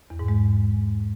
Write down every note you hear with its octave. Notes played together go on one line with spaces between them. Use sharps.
E2
G#2
G#3